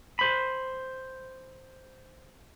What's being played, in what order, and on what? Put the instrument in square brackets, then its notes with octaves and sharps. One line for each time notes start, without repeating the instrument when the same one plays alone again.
[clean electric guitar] C5 B5